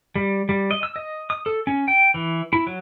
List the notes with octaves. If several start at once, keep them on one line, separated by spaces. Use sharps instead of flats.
G3
G3
D#5
E6
D#5
D#6
A4
C#4
G5
E3
E4
F#3